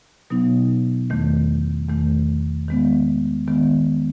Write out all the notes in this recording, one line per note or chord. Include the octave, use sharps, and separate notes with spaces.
B2 F#3 B3 D#4
E2 D#3 A3
E2 D#3 A3
D#3 G#3 B3
D#3 G#3 B3